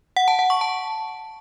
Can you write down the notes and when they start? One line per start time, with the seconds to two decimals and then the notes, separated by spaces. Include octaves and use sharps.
0.16 F#5
0.28 A5
0.39 F#5
0.50 C#6
0.61 A5